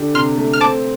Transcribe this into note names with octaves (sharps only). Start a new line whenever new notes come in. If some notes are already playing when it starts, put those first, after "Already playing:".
Already playing: D3 G4
C3 C6 F6
A3
F6
C4 A5 D6